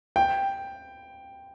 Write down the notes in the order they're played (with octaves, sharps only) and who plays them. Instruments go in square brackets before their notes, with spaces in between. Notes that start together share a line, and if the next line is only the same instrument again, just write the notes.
[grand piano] G5